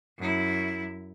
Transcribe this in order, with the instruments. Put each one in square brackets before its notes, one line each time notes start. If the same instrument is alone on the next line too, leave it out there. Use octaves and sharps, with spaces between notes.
[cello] F#2 E4